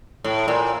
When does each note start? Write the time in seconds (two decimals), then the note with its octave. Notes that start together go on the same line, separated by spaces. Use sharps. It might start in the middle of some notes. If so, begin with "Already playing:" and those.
0.24 A2
0.48 A#2